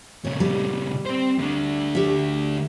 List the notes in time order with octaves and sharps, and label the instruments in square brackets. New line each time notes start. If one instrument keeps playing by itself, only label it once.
[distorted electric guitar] A#2 C#3 [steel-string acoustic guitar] C#5
[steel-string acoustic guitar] G3
[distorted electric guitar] C4 C5
D2 D4
[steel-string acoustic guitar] G4 E5